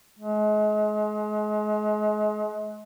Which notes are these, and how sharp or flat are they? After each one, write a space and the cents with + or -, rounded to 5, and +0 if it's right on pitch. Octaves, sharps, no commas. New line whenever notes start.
G#3 +35